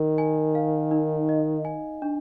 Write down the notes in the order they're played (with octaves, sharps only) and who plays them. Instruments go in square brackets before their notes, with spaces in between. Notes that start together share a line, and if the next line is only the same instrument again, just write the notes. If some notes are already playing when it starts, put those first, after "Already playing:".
Already playing: [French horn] D#3 [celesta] A#4
[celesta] G#5
F5
D#4
D#5
G#5
D4